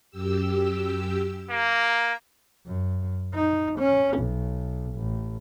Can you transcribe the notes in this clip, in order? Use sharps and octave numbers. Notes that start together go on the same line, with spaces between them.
F#2 G4 E6
A#3 A#5
F#2
D#4
C#4
B1
A1